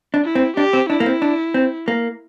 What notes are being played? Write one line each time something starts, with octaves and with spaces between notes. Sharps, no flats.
D4
E4
C4
D4 G4
C4
D4 E4
A#3
C4
D4
C4
A#3